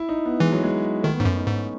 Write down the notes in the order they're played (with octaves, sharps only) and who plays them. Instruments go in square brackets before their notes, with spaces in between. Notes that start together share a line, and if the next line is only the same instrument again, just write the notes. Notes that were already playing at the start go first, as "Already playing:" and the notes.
Already playing: [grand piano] E4
D#4
B3
[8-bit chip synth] E3 [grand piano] G#3
[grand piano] F#3
G#3
[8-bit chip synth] D#3 [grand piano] A3
[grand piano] B3
[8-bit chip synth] G#2 [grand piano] C#4
[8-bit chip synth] F#2
[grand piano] D#4
[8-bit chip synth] G#2 [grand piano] C#4